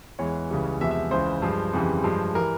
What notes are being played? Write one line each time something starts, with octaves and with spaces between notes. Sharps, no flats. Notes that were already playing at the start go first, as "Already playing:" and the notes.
E2 E3 G#3 C#5
C#2 C#3 E3 G3
E2 C3 F3 G#3 E5
E5
C#2 C#3 E3 C5
G2 F3 G#3
F2 C#3 E3 G3
G2 F3 G#3
E3 G3 A#4